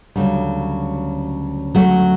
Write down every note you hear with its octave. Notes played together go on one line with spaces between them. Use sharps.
D2 C#3 F#3 G3
F#3 A3